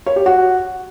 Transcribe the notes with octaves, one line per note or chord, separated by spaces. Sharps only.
C#5
G4
F#4